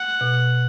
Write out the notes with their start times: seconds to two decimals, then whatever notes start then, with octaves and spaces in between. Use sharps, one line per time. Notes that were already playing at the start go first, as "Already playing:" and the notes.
Already playing: F#5
0.21 B2